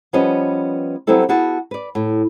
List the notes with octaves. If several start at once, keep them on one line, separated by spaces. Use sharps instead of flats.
F3 G3 B3 C#4 B4 D#5
F#3 G3 B3 C4 E4 A4
B3 E4 F#4 G#4 A5
B4 D5
A2